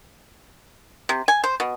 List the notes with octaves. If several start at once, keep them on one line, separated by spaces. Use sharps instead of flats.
C3
G#5
C5
B2